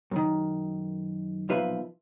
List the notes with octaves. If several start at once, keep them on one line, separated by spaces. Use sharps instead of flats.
F#2 D#3
B1 A#2 F3 F4 B4 E5